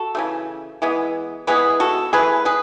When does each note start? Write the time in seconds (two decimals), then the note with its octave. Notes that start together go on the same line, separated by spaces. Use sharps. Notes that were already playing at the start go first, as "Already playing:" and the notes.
Already playing: F#4 A4
0.15 C#3 E3 A3
0.82 E3 G#3 B3
1.47 E3 G#3 B3 G#4 B4
1.80 F#4 A4
2.13 E3 A3 G#4 B4
2.45 G#4 B4